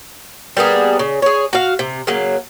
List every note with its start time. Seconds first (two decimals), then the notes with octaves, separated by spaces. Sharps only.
0.57 G3 A#3 B3 G#4
0.99 C#3
1.22 G#4 C#5
1.53 F#4 F5
1.79 C3
2.07 C#3 F#3 A#3